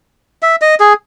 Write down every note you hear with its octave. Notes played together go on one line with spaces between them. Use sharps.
E5
D#5
G#4